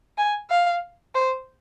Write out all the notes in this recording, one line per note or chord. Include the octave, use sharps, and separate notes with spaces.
G#5
F5
C5